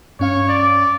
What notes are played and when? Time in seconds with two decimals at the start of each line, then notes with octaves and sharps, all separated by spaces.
0.20 G2 C#4 C#5 F5
0.49 D5